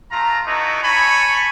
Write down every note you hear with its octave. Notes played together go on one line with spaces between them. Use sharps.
A3 F4 A#5
A3 B3 D#4 E4 F#4
C#5 G#5 A5 B5 C#6